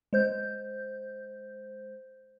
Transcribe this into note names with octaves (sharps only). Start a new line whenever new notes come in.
G#3 C5 G6